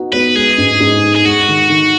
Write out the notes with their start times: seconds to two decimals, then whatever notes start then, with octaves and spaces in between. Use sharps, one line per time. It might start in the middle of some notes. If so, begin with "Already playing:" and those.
Already playing: B3 D#4 F#4
0.12 B3 B4
0.35 G#3 G#4
0.58 G#2
0.80 G#2
1.03 G#3
1.15 G#4
1.25 G#3 F#4
1.48 D#3
1.70 D#3